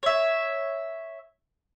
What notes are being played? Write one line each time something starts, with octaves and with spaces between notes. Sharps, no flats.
C#5 E5